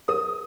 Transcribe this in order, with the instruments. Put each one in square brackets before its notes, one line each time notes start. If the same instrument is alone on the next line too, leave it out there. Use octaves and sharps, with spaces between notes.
[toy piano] A#4 [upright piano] D#6